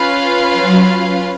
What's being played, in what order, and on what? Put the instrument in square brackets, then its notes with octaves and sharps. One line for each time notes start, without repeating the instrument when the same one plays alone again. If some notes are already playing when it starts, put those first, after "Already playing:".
Already playing: [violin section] C#4 F4 B4 F5
[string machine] F#3